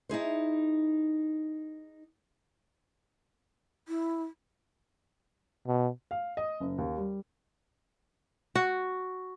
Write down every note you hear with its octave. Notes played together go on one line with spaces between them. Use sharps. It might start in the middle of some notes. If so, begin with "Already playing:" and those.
D#4 E4 G#4 C5
E4
B2
F5
D#5
F#1
D#2
G3
F#4